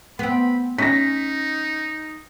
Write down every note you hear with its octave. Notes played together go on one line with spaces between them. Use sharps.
B3 C4 B5
C#4 D#4 A#6 B6